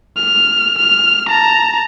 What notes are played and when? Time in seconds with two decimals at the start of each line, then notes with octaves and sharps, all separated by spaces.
0.17 F6
0.79 F6
1.29 A5 A#5